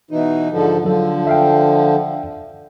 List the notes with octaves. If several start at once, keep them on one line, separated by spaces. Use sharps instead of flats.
B2 E3 D#4
G#2 D3 F3
D3 F3 F#3 A4
E5 F5 G5